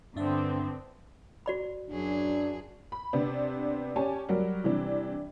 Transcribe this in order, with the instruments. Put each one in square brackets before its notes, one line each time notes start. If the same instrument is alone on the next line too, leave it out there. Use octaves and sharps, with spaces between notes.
[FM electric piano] G2 D4 E5 [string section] D3 B3 C4
[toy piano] F#4 D5 B5
[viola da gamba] F#2 F#3 G#4 [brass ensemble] D4
[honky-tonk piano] B5
C3 B3 C4 D4
C#4 G4 C#5 D5 G#5 A5
F#3 G3 F#4 A#4
C3 E3 G3 D4